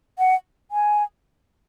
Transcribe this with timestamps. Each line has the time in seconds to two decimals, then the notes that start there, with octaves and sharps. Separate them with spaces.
0.19 F#5
0.71 G#5